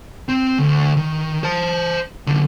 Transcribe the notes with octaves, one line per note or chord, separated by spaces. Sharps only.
C4
D2
D#3
C5 A5
F#2 D3